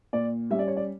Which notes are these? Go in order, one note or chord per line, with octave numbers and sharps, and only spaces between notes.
A#2 D5
G3 C#4 E5
D5
C#5
D5